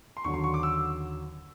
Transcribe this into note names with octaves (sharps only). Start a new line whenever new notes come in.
C6
D#2 D3 F#3 C#6
C6
C#6
D6
E6